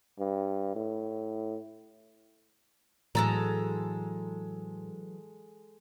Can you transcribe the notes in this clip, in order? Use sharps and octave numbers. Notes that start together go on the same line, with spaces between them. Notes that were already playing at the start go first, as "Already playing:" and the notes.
G2
A2
A2 E3 F#3 G#3 A4 A#5